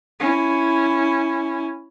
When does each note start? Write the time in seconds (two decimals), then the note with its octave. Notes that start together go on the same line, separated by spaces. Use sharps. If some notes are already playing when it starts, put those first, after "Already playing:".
0.20 C#4 E4